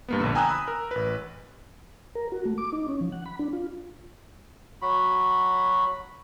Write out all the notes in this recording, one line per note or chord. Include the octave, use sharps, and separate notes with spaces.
G2 A#3 B3
A#1 D3
G5 G#5 A#5 D#6 E6 F#6
B5 D#6
A#4
A1 B4
A#4
F#4
A3
D6
D#4
C#4
F3
F#5
B5
D4
F4
F#3 F#4 B5